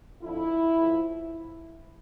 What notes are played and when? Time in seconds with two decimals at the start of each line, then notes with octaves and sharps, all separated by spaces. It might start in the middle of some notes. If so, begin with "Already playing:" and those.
0.22 F2 D3 F3 E4
0.78 A2 F3